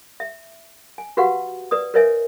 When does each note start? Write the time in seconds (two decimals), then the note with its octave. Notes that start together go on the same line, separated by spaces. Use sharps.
0.20 E5
0.98 G#5
1.17 F#4 G4 B4 F5 F#5 C#6
1.71 B4 D5 D#6
1.94 A#4 B4 C#5 D#5 E5 G#5